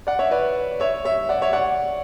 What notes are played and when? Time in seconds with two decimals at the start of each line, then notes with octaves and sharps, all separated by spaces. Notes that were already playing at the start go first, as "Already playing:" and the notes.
0.07 D5 F#5
0.19 C#5 E5
0.31 B4 D5
0.80 C#5 E5
1.05 C#5 E5
1.29 D5 F#5
1.42 C#5 E5
1.53 D5 F#5